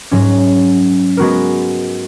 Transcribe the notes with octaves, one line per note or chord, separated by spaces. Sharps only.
G#2 F#3 C#4
G#3 B3 F#4 A#4